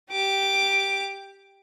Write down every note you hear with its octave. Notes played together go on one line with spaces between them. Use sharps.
G4 D6